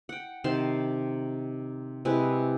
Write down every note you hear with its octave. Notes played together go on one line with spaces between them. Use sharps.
F#5 G5
C3 D#3 A5 C6
C3 G#3 E4 B4